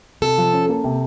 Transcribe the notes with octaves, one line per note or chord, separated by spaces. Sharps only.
C3 A4
F3
C#4
A#3
C3